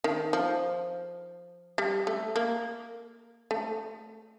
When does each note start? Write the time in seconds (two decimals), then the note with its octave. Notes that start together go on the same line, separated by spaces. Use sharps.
0.04 D#3
0.33 F3
1.78 G3
2.07 A3
2.36 A#3
3.51 A3